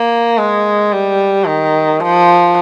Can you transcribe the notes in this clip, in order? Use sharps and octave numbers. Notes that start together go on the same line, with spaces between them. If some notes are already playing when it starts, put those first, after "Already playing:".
Already playing: A#3
G#3
G3
D#3
F3